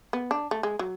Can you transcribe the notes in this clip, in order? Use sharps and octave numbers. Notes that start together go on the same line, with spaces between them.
B3
D4
A3
G#3
F#3